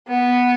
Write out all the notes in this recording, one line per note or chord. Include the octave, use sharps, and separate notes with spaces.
B3